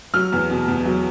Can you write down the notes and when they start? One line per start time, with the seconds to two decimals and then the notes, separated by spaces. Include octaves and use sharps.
0.13 F#3 F6
0.32 E2
0.50 B2
0.68 E2
0.85 F#3